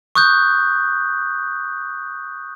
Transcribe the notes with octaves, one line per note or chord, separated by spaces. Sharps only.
C#6 D#6 F#6 G6